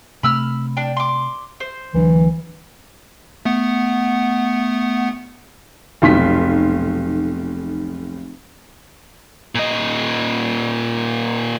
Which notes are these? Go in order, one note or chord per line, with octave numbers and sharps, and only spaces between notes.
C3 A3 B5 E6 F6
D4 G5
C6 D6
C5
D2 E3 F#3 D4
A3 B3 F#5
F1 B1 C6 B6
A#2 D#5